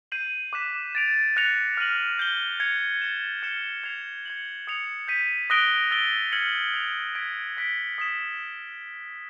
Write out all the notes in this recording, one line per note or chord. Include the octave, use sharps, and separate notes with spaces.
G6 C7 D#7 F#7
D6 F#6 B6 E7
A6 D7 F7
F#6 A#6 C#7 F7
F6 A#6 D#7 F#7
G6 C7 D#7 G7
G#6 C#7 F7
A6 C#7 E7
F6 G#6 C#7 E7 G7
G#6 C7 F7
G#6 C#7 F#7
D#6 G#6 C#7 F7
G6 B6 D#7
D#6 F#6 A#6 D7 G7
E6 A6 D7 G7
F6 G#6 C#7 F#7
G#6 C7 F7
G#6 B6 D7
F#6 B6 D7 G7
D#6 G#6 B6 E7